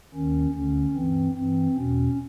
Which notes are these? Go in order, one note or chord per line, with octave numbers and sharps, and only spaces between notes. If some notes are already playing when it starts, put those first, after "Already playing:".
D#2 D#3 C#4
D2 D3 C#4
G2 E3 C4
G2 C4
E3
E2 B2 C#4